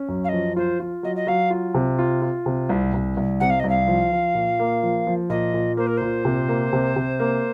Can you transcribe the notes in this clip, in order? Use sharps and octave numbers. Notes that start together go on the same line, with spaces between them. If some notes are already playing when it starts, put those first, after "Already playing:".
Already playing: C#4
F#2
F5
F3 D#5
F4 C5
F4
F#3 D#5
D#5
F#3 F5
F4
C3
F4
F4
C3
C2
C2
C2
C3 F#5
F5
C2 D#5
F5
F3
F3
A#2
A#3
F3
F3
A#2 D#5
A#2
A#3 C5
A#4
A#2 C5
C3
A#3
C3
C3
A#3